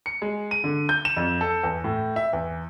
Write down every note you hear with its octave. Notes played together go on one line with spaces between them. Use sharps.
C#7
G#3
D#7
D3
G6
E7
F2
A4
E2
A2
E5
E2